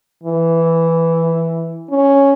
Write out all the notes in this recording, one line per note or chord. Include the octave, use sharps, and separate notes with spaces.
E3
C#4